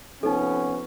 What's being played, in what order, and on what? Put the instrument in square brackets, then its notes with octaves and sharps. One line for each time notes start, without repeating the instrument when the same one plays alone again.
[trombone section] C3 F3 B3 [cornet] C#4 [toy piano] D#4 A4